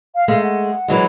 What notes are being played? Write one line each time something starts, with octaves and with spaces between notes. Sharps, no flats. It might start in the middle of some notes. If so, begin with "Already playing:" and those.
F5
G#3 A3 F5
F#5
E3 F#3 G#3